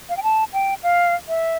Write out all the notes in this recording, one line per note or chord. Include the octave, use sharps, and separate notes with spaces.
F5
G5
A5
G5
F5
E5